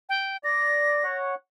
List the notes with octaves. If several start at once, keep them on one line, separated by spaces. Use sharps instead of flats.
G5
D5 A#6
C#5 F#5